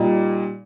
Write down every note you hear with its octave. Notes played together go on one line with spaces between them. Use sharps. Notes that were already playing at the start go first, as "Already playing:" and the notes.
Already playing: A#2 G3 A#3 D#4